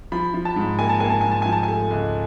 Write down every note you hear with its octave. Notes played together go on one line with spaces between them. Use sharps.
F3 B5
F3
A5
G#2
A#3 G#5
A5
A#3 G#5
A5
G#2 G#5
A5
F3 G#5
A5
A3 G#5
C#2